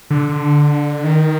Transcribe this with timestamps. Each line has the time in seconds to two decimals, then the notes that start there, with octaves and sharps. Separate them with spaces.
0.10 D3
0.29 D3
1.04 D#3